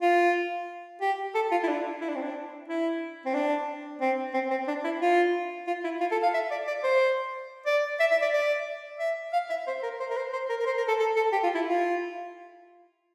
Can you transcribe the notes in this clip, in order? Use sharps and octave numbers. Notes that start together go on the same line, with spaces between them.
F4
G4
A4
F4
E4
D4
E4
D4
C4
D4
E4
C4
D4
C4
C4
C4
D4
E4
F4
F4
E4
F4
A4
F5
E5
D5
D5
C5
D5
E5
E5
D5
D5
E5
F5
E5
C5
A#4
C5
A#4
C5
C5
A#4
A#4
C5
A#4
A4
A4
A4
G4
F4
E4
F4